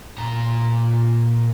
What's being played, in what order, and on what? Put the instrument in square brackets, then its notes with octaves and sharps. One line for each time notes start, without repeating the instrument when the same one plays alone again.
[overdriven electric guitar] A#2 A#5